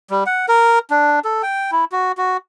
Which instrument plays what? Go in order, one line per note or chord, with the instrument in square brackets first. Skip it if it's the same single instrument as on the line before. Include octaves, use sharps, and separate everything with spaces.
[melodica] G3
F#5
A#4
D4
A4
G5
E4
F#4
F#4